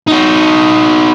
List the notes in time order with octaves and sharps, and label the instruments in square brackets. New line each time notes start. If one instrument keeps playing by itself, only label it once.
[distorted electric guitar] D#4 F#4